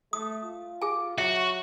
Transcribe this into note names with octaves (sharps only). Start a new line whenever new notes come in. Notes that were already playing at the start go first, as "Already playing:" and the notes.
A3 D#6
F4
G#4 G#5
F#3 F#4 E5